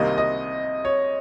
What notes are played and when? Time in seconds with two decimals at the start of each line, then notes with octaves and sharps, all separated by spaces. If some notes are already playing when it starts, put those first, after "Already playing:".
Already playing: C2 C3 D#3 A#3 D#5
0.18 D#5
0.85 C#5